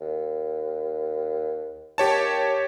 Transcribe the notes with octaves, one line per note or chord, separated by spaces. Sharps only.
D#2
D#2 G4 C#5 A5